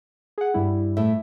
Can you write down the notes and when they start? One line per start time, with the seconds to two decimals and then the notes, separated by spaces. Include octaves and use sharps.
0.38 G#4 F#5
0.54 G2 G3 E4
0.97 A2 E5